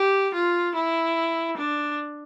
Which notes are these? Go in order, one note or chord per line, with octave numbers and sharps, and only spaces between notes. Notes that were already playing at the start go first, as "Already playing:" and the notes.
Already playing: G4
F4
E4
D4